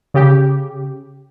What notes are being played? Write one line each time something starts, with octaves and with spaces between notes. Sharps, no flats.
C#3 G4